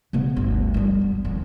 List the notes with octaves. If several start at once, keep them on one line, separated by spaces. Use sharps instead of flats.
C#3 B3
G1 D2
G3 D4
B3
F2 D#3